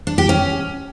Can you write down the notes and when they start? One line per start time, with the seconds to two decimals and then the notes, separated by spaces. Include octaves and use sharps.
0.07 D4
0.18 G4
0.29 C#4